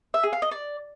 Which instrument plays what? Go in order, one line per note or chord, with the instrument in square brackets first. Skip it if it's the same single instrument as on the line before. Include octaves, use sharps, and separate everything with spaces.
[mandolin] E5
G#4
F5
D#5
D5